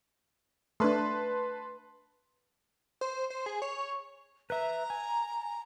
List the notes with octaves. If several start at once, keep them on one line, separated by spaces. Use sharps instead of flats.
A3 D4 B4 A5 C6
C5
C5
G#4
C#5
B4 E5 A#5
G#5